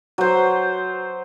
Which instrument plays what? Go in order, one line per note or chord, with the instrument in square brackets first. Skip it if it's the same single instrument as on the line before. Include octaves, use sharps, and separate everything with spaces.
[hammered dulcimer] F#3 C5